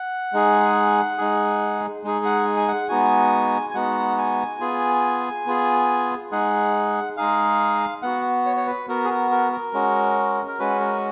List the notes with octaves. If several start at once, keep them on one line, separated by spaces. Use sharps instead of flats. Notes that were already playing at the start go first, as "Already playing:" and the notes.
Already playing: F#5
G#3 D#4 G#4
G#3 D#4 G#4
G#3 D#4 G#4
F#5
G#5
F#5
G#3 B3 D#4 F#4 G#5
G#5
G#3 B3 D#4 F#4 F#5
G#5
B3 F4 G#4
B3 F4 G#4
G#3 D#4 G#4 F#5
G#3 D#4 G#4 F5
B3 F#4 F#5
C#5
C#5
B4
B3 F#4 A#4
G#4
A#4
A#4
A#4
G#3 C#4 F#4
A#4
G#3 C#4 F#4 B4
A#4